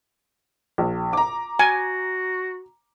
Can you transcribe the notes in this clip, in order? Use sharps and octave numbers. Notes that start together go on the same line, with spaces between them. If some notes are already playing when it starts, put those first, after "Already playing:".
A#1
A#5 D6
F#4 G#5